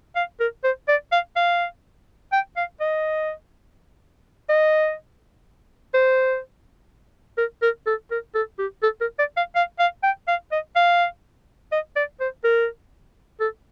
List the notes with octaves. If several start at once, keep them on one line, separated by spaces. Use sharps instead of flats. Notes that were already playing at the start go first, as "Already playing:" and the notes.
F5
A#4
C5
D5
F5
F5
G5
F5
D#5
D#5
C5
A#4
A#4
A4
A#4
A4
G4
A4
A#4
D5
F5
F5
F5
G5
F5
D#5
F5
D#5
D5
C5
A#4
A4